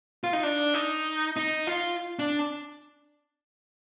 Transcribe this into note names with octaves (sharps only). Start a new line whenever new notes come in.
F4
D#4
D4
D#4
D#4
F4
D4